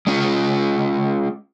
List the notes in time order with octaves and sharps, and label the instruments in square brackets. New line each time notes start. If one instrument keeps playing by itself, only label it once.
[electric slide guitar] G#3 C#4 F4